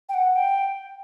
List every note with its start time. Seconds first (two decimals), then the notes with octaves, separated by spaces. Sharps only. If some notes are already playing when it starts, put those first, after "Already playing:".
0.09 G5
0.14 F#5
0.36 G5